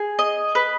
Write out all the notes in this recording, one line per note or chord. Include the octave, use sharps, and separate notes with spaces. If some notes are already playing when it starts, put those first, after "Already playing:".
Already playing: G#4
D#5
B4